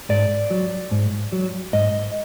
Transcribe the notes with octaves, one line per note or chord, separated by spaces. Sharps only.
G#2 D5
F#3
G#2
F#3
G#2 D#5